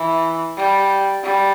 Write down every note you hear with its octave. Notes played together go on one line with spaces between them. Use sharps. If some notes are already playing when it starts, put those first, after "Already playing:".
Already playing: E3
G3
G3